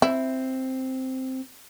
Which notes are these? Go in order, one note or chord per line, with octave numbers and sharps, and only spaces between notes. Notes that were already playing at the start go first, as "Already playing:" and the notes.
C4 E4